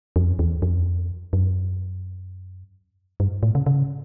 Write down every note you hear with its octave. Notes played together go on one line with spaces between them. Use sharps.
F2
E2
F2
F#2
G2
A2
C#3
C#3